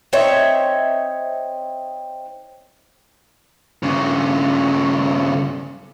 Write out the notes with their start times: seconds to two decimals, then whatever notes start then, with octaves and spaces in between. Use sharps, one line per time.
0.13 C4 D#4 C#5 E5
3.83 G2 C#3